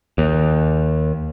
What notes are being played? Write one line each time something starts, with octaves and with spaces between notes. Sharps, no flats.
D#2